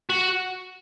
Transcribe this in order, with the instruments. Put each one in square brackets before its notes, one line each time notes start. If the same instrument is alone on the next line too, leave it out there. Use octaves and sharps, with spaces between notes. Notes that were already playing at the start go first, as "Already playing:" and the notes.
[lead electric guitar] F#4